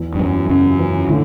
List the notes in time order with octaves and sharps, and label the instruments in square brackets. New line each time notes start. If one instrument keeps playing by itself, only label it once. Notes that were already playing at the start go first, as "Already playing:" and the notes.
Already playing: [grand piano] E2
[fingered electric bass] G2
[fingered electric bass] F#2 [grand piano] E3
[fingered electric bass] F#2 [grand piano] C#3
[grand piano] E3
[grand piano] A2 [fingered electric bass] D3